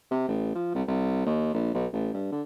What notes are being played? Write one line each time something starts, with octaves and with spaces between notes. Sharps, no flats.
C3
A1
F3
C2
C2
D#2
A#1
B1
A1
G2
D3